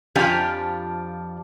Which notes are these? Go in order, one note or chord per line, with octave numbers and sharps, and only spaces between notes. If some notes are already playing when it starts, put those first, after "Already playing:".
F2 F3 D4 F4 G4 G#5